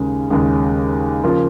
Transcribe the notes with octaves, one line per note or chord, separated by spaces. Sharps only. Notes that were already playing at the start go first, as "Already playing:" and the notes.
Already playing: D#2 C#3 G#3 C#4
D#2 C#3 G#3 C#4
C#3 F3 A#3 F4